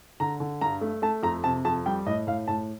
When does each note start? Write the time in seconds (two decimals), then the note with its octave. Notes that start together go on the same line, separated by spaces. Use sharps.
0.20 D3 A#5
0.40 D3
0.61 G2 A#5
0.81 A3
1.02 A3 A5
1.23 F2 A#5
1.44 C3 A5
1.65 F2 A5
1.86 G3 G5
2.06 A2 D#5
2.27 A2 F5
2.48 A2 A5